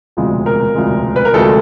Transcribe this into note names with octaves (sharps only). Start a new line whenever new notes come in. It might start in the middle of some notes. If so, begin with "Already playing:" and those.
E1 D2 C3 F3 G#3
A#4
E1 D2 C3 F3 G#3
B4
A#4
D2 C3 F3 G#3 A4